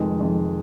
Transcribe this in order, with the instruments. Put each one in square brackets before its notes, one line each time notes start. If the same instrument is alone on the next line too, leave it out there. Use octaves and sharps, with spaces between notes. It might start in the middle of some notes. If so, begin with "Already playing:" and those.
Already playing: [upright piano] F1 F2 D#3 G#3
F1 F2 D#3 G#3